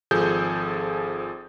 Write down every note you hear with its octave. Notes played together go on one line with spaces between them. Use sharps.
G#1 F3 G#4 A4 G6